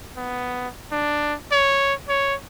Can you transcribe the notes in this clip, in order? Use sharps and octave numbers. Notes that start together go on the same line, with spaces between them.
B3
D4
C#5
C#5